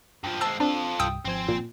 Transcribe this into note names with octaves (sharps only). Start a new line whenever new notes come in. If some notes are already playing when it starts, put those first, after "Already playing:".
G2 F3
G#3 C4 A5 E6
C4 D4 F4 A4
C2 G2 G5 D#6 E6
G#1 F3 C4 C5 G#5
A#2